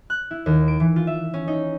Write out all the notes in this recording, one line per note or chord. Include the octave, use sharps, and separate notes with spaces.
F#6
E4
D#2
D7
E3
F4
E5
C#4
D#4